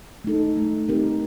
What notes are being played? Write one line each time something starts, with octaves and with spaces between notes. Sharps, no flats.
A3 D#4 A4
A3
C4 D#4 G4 A#4